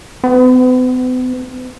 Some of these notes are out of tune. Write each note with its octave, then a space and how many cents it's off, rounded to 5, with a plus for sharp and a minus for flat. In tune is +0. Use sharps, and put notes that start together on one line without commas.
B3 +45